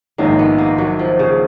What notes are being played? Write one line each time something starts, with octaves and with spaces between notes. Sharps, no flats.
A#1 G#2 D#3 G#3 A#3 D#4
B3
A#3
F#3
F3
C#3